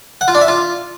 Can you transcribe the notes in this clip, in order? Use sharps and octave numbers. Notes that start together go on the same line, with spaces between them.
F#5
F4
D4
E5
F4